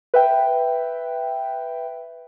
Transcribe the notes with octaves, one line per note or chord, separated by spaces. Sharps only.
B4 E5 G5